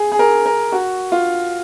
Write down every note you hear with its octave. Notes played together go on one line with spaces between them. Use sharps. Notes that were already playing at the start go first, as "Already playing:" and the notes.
Already playing: G#4
G#4
A#4
A#4
F#4
F4